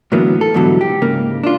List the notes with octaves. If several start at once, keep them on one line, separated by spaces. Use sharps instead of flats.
A2 D3 E3 F#3 A#3 B3
A4
G#2 B2 D3 E3 F#3 G3
G4
G#2 C#3 A#3
D4 F4